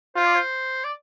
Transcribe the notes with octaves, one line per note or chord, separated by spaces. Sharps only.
F4 C5
D5
C5
D5